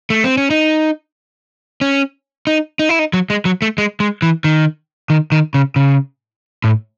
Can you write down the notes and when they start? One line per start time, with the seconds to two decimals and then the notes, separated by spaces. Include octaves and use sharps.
0.10 A3
0.24 C4
0.37 C#4
0.50 D#4
1.81 C#4
2.47 D#4
2.79 D#4
2.89 E4
2.99 D#4
3.13 F#3
3.30 G#3
3.45 F#3
3.62 A3
3.78 G#3
4.00 G#3
4.22 E3
4.44 D#3
5.10 D#3
5.32 D#3
5.54 C#3
5.76 C#3
6.64 A2